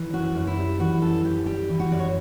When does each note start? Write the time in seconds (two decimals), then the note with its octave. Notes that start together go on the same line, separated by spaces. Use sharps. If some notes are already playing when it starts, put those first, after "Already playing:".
Already playing: E3
0.13 F#2 F#4
0.35 F#2
0.47 E4
0.57 G3
0.79 E3 F#4
1.02 F#2 A4
1.24 F#2 G4
1.46 G3 G4
1.70 E3
1.80 F#4
1.91 F#2 D5
1.99 C#5